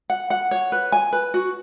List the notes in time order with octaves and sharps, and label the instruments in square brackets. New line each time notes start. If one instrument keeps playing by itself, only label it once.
[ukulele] F#5
F#5
C#5
B4
G#5
B4
F#4